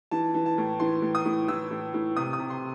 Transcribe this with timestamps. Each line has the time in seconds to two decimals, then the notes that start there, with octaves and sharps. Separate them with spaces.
0.11 E3 A5
0.34 E3
0.46 A5
0.58 A2
0.80 E3 C6
1.02 A2
1.15 D#6
1.25 A2
1.48 E3 E6
1.71 A2
1.94 A2
2.17 C3 D#6
2.33 D#6
2.39 C3
2.50 C6